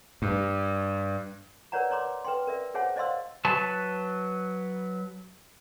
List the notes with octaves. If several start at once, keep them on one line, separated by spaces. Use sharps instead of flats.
G2
A#4 B4 C#5 D5 F#5 A#5
C#5 D5 A#5 C6 D6
B4 G5 C6
A#4 D5 E5
G#4 C5 C#5 E5 F#5 G#5
C5 D5 D#5 F5 C6 E6
F#3 B4 A5